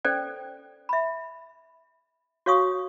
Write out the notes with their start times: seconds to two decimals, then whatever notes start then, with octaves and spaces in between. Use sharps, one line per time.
0.05 C#4 A4 C5 D5 G5
0.89 E5 B5
2.46 F#4 C#5 F5 C#6 D#6